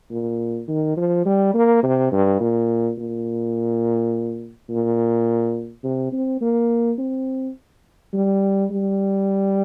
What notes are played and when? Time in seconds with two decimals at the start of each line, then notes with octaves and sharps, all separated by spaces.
0.10 A#2
0.68 D#3
0.97 F3
1.25 G3
1.54 A#3
1.83 C3
2.12 G2
2.40 A#2
2.98 A#2
4.70 A#2
5.83 C3
6.12 C4
6.41 A#3
6.98 C4
8.13 G3
8.70 G3